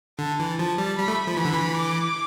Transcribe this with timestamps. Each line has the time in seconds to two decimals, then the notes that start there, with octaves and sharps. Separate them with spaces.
0.19 D3 A5
0.40 E3
0.59 F3 A5
0.78 G3
0.98 G3 B5
1.08 A3
1.27 F3
1.37 E3 B5
1.45 D3
1.53 E3
1.77 D6